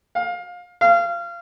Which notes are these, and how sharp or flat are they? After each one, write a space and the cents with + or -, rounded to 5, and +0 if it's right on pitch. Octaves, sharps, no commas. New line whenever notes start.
F5 +25
F5 -25